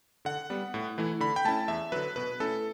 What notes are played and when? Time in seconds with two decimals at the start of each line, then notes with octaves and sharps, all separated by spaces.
0.25 D3 F#5
0.50 G3 B3
0.74 A2
0.98 E3 A3 E4
1.20 D3 B5
1.36 G5
1.45 A3 C#4 E4 A5
1.68 E2 E5
1.92 D3 F#3 B4
2.16 B2 B4
2.40 A3 C#4 E4 A4